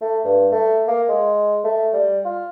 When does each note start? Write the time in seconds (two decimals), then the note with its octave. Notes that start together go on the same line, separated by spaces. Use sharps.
0.01 A3
0.24 G2
0.52 A3
0.87 A#3
1.09 G#3
1.64 A3
1.94 G3
2.25 F4